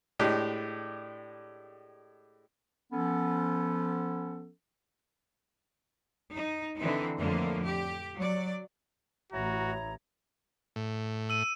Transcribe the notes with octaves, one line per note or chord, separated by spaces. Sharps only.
A2 G#3 D4 G4
F3 B3 C#4 A4
D#4
D3 E3 C4 D#4
F2 A2 D3 A#3
G4
F#3 D5
A1 E4 F#4 C#5 A#5
A2
E6 D#7